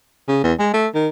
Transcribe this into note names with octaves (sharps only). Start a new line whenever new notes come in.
C#3
E2
G#3
A3
D#3